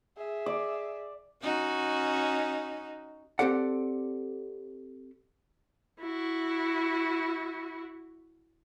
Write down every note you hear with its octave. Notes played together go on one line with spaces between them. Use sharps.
G#4 E5
D5
C#4 D#4 F#4
C4 G4 A4 D5 F#5
E4 F#4